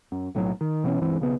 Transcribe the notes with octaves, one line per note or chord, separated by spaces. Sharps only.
F#2
B1 A2 F#3
D#3
B2 E3 C4 C#4
C#2 G2 E3 C4
B1 C#3 B3